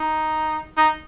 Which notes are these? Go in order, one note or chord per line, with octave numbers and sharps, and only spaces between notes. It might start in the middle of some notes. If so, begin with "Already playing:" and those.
Already playing: D#4
D#4